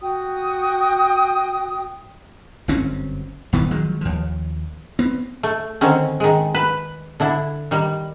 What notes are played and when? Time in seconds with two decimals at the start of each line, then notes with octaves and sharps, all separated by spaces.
0.01 F#4 G5 D#6
2.68 G1 F#2 C4 C#4
3.53 D#1 D#3 E3 B3
3.71 D#3 F3 F#3 G#3
4.01 D#2 F3
4.99 B3 C4
5.43 A3
5.81 D3 D#3 C4 C#4
6.20 D#3 G#3
6.55 B4
7.20 D3 D4 E4
7.71 D#3 G3